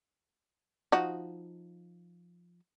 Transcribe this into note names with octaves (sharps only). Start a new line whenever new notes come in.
F3 D#4 F#4